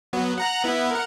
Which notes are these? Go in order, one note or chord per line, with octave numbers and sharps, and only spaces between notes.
F#3 B3
F#5 A#5 F#6
B3 E4
A#4 F#5